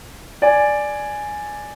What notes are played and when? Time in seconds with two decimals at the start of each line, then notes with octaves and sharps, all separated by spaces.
0.42 D5 G#5